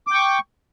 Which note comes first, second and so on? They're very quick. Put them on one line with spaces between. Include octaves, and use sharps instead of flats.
D6 G5 C#6